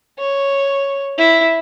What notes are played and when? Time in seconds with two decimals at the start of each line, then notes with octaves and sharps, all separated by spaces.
0.19 C#5
1.18 E4